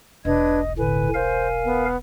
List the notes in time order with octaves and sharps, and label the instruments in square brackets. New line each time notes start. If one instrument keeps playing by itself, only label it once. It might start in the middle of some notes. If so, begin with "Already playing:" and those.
[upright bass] E1 B1 [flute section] D4 B4 G#6 [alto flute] D#5
[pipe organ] A2 D3 [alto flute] B4 [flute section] G#5
[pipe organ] A#4 F5 [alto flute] C5
[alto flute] B3